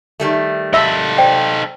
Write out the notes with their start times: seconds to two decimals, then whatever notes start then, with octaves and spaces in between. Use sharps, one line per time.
0.20 D#3 G3 A3
0.74 D#4 A4 E5
1.18 C5 D5 G5